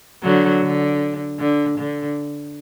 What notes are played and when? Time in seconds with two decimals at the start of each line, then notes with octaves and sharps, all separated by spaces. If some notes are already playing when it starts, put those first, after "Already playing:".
0.23 D3 F#3
0.62 D3
1.39 D3
1.78 D3